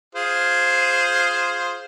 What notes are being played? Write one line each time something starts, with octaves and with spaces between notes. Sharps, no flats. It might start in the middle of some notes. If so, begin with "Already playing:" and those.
F4 G#4 C5